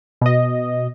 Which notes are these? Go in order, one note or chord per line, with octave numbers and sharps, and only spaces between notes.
B2 D#5